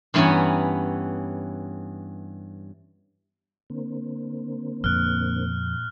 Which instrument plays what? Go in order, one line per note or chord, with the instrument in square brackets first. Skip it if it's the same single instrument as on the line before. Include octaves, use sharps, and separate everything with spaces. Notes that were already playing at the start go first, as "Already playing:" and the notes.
[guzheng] G2 E3 B3 C#4 G#5 A#5
[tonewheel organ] D3 A#3 C4
[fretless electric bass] F2 [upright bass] A#2 [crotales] F6 F#6